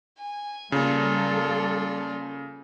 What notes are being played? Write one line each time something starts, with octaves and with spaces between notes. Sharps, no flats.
G#5
C#3 G3 A#3 F4 A4 D5